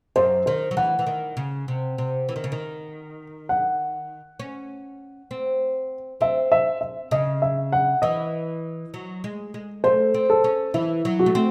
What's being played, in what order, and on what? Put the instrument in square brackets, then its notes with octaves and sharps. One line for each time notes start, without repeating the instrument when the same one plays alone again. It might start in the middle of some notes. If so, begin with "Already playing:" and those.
[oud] F#2 [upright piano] C5
[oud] D#3 [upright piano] C5
[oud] F#3
[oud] E3 [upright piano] F#5
[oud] E3
D#3
C#3
C3
C3
E3
D#3
C#3
D#3
[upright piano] F#5
[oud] C#4
C4
[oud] C4 [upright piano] E5
[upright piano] E5
E5
[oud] C#3 [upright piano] D#5
[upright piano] E5
F#5
[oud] E3 [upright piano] D#5
[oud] F#3
G#3
G#3
[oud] A3 [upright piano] C5
[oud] C4
[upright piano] A4
[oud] C#4
[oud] E3 [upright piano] E4
[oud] F#3
[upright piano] F#4
[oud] A3
C4